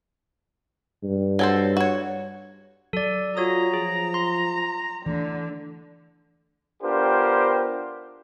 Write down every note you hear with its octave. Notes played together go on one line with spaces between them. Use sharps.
G2
F#3 A4 C5
F#4 C#5
F#3 A4 D5
F4 F#4 C#5 A#5 D#6
F3 G#4
C6
D3 E3 A3
B3 D4 F4 G4 A#4 C5